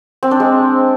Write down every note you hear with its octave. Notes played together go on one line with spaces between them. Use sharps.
C4
D4
G#3